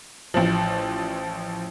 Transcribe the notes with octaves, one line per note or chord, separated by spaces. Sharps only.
A1 F3